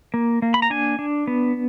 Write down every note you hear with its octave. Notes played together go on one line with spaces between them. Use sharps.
A#3
A#3
B5
A#5
D4 G#5
D4
B3